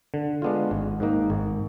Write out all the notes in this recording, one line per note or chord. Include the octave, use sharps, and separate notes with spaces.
D3
G#3 B3 D4 F4
G#1
G#2 D#3 A#3 D#4
G#1